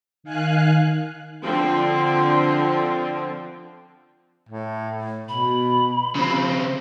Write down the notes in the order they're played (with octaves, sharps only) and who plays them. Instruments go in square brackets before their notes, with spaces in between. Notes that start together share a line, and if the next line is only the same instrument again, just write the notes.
[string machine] D#3 F5 G#5 F#6
[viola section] D3 F3 C4
[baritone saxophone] A2
[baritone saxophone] B2 [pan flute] B5
[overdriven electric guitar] C#3 C4 [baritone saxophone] F3